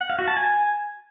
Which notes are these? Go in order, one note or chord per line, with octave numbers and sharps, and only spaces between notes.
F#5
F5
F#4
A5
G#5